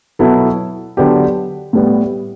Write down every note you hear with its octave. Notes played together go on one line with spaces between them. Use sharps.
B2 F#3 B3 E4 A4
D3 F#3 B3 D4 G4
A2 G3 B3